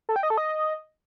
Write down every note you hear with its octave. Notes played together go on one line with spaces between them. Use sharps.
A4
G5
D#5
A4
D#5